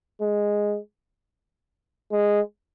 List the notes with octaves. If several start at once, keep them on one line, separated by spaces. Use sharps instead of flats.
G#3
G#3